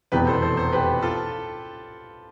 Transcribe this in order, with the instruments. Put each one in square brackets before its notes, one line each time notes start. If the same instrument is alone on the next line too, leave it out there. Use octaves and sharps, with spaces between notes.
[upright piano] F1 E2 B2 B3 [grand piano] G4 B4
[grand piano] A4 C5
A4 C5
A4 C5
G4 B4
F4 A4